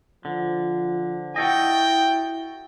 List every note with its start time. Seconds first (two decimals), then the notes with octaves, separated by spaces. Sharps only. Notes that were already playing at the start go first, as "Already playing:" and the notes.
0.25 D3 F3
1.36 E4 F#4 A4 D#5 G5